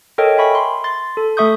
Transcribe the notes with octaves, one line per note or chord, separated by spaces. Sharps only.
A4 A#4 C#5 D#5 G5
E5 G#5 B5 C#6 B6
C6
C6 A6
A4
A3 A4 E5 C#6 D#6 G6